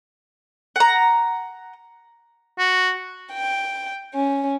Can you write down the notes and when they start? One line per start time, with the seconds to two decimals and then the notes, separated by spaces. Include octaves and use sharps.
0.76 F#5 A#5
2.59 F#4
3.32 G5
4.12 C#4